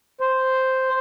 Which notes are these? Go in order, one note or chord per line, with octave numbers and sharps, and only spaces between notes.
C5